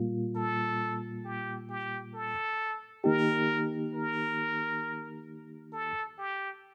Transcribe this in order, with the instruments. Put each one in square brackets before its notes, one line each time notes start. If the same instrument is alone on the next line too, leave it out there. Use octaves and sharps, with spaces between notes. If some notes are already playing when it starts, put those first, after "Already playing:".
Already playing: [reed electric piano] A#2 G3 A#3 F4
[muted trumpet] A4
G4
G4
A4
[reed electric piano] D#3 A#3 D#4 G4 [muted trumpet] A#4
[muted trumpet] A#4
A4
G4